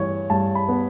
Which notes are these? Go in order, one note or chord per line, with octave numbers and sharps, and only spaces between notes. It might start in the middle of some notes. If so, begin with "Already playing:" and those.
Already playing: G2 E3 C#5
G2 A5
B5
B3